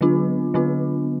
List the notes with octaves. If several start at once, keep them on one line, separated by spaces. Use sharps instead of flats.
D3 F#3 B3 D4 F4
D3 F#3 B3 D4 F4